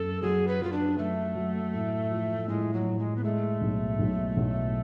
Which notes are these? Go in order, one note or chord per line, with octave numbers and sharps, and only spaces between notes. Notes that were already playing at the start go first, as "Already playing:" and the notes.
Already playing: F#2 A4
F#3 G#4
B4
F#3 F4
D4
F#3 A3
F#3
A2
F3
A2 G#3
F#3
A2
G#3
B3
G#3 A3
B1
B1
B1